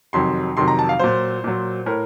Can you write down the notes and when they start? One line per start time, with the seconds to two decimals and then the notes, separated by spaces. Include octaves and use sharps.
0.13 F2 C3 D#3 F#3 C6
0.57 F2 C3 D#3 F#3 C6
0.68 A#5
0.79 A5
0.89 F5
0.99 A#2 F#3 C5
1.44 A#2 F#3
1.86 A2 A#4